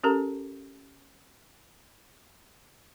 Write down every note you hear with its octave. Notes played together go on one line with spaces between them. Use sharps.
C#4 G4 A4 A#4 A#5